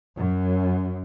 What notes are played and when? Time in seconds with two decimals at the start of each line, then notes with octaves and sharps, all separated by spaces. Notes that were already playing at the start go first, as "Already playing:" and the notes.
0.16 F#2